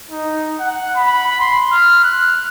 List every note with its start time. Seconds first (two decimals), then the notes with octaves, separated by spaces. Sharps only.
0.10 D#4
0.60 F#5
0.96 B5
1.41 C6
1.72 F6
2.04 F#6